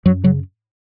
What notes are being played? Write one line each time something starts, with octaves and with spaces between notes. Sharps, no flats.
F#2 F#3
C#3 F#3